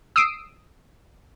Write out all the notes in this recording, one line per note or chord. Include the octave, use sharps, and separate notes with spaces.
D#6 E6 C7 D7